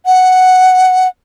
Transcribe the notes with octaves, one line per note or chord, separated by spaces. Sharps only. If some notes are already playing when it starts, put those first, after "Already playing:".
F#5